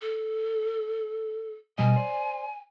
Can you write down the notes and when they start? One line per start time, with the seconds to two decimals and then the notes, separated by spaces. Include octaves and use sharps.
0.02 A4
1.78 B2 G3 D#5 G#5
1.96 C5 D5